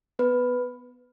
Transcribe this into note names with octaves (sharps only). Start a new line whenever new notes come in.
B3 B4